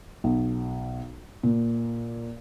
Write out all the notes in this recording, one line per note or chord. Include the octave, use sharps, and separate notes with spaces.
B1
A#2